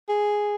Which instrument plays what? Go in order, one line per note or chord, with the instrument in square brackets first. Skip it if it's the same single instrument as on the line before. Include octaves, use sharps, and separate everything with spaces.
[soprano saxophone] G#4